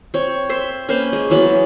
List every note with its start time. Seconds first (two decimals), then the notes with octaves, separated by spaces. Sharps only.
0.14 C4 C#5
0.49 C5 E5 C6
0.89 A#3 C#4 B4 C5
1.13 G#3
1.30 E3 F#3 B3